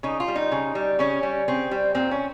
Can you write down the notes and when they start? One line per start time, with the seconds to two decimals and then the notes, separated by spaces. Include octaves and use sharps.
0.03 C#3 D#4
0.20 F4
0.28 G3
0.36 D#4
0.52 C#3
0.75 G3
0.99 C#3 C#4
1.23 G3
1.48 C#3 C4
1.71 G3
1.95 A#2 C4
2.11 C#4